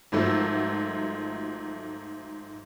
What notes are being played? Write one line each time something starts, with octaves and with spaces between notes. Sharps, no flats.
G#1 G#2 F3 F#3 A3 E6